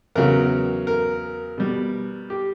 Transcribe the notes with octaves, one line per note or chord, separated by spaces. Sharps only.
E2 C#3 F#3 A#4
A#4
B2 G3
G4